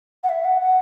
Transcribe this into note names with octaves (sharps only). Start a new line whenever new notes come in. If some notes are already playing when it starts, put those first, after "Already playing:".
F#5
E5
F#5
F#5